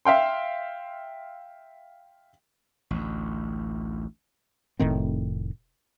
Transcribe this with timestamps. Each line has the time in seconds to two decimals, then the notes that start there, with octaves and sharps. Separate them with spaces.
0.05 E5 F5 G5 C6
2.91 A1 D2
4.79 F1 A2 D#3 C4